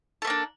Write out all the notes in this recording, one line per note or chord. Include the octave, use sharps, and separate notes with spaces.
A3 A#3 D4 A4